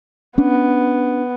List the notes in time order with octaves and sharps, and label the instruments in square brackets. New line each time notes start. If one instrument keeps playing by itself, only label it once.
[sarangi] B3 [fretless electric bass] C#4 D4